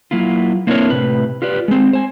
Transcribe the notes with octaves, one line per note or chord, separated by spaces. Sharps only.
F#3 A#3 E4 F4
A#3 C4 D4 E4 A#4 C#5
A2 C3 B4
F4 G4 B4 D5
G#3 C4
C5 G#5